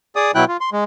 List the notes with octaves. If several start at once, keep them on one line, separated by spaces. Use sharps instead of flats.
G#4 D5 D#6
B2 F#3 E4 G5 F#6
F4
C6
G#3